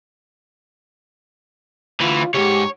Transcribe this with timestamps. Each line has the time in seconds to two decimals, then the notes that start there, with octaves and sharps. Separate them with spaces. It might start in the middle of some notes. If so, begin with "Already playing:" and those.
2.00 D2 E3 F4
2.34 C#2 G#2 G4 C#5